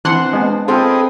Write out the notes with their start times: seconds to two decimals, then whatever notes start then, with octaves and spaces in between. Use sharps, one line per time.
0.05 E3 C4 D4 F#5 C6
0.33 G#3 B3
0.68 C4 F4 G#4 A4 B4 D#5 G5